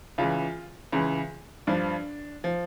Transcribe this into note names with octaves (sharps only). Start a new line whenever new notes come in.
C#2 C#3 E3 F4
C#2 C#3 E3
G2 F3 D4
F3